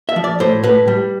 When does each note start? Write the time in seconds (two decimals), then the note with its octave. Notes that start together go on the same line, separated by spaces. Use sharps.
0.09 E5
0.16 F3
0.24 D5
0.40 A2 C5
0.64 A2 B4
0.88 G3